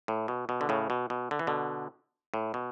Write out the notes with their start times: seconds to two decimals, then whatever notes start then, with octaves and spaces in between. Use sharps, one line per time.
0.08 A2
0.28 B2
0.49 B2
0.61 D3
0.69 A2 C#3
0.90 B2
1.10 B2
1.31 D3
1.39 E3
1.47 B2 D3
2.34 A2
2.54 B2